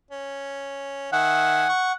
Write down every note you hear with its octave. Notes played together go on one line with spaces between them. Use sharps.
C#4
D#3 E5 F#5 G#5
C#6